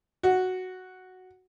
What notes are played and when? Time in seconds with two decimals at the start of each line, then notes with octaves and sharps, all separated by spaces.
0.23 F#4